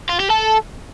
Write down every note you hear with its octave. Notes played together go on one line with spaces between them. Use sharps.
F4
G4
A4